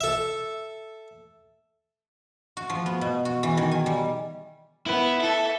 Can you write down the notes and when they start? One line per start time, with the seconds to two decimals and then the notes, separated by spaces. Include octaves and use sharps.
0.01 A4 E5
2.57 F#4
2.70 F3
2.86 B3
3.01 B2
3.25 F#4
3.43 E3
3.57 D#3
3.71 G#5
3.86 G3
4.86 B3 E4
5.21 A4 E5